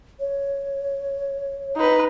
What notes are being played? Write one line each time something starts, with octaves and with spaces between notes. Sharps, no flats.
C#5
D#4 B4